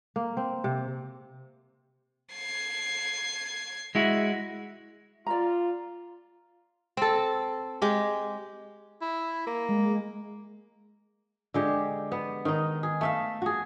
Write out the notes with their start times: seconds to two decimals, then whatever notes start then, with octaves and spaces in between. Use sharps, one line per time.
0.16 A#3
0.37 C4
0.64 C3
2.33 G#6 C7
3.95 G#3 E4 F#4
5.26 F4 D5 A#5
6.97 C4 A4
7.82 G#3 G4
9.01 E4
9.47 A#3
9.69 G#3
11.54 D3 G#3 G4
12.12 B3
12.45 D#3 D#4
12.83 G#4
13.01 A3 E5 F5
13.42 F#4 G#4